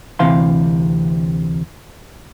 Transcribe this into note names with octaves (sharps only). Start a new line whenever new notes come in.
D2 C3 E3 F5 C6